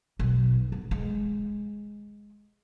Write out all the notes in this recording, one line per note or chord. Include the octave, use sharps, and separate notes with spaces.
B1
B3
G#3